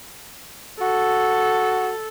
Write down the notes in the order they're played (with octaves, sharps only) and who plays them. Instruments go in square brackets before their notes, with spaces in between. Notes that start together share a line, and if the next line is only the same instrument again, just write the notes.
[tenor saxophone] F#4 [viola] A4